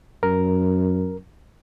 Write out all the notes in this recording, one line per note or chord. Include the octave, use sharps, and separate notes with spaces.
F#2 A#4